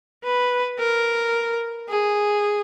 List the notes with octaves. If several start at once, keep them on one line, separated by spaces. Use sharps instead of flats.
B4
A#4
G#4